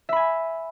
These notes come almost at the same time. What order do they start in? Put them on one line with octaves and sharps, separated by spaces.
E5 B5 G#5